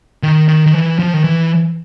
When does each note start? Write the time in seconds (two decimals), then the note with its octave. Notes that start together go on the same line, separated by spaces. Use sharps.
0.23 D#3
0.48 D#3
0.66 D#3
0.74 E3
0.99 F3
1.14 D#3
1.24 E3